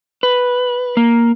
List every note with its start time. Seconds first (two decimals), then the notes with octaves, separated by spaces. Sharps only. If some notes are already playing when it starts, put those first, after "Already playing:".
0.23 B4
0.97 A#3